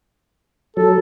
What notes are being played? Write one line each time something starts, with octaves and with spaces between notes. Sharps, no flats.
F#3 A4